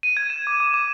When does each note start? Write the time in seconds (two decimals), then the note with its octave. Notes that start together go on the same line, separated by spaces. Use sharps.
0.03 D#7
0.17 G#6
0.30 E7
0.47 D6
0.60 D6
0.74 D6